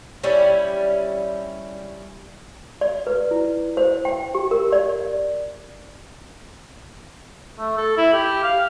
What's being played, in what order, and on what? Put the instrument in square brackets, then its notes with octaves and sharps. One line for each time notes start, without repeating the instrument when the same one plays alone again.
[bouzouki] G3 C#4 E4
[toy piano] D5
B4
E4
C5
G5
G4
A#4
D5
[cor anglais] A3
A4
E4
G4
F5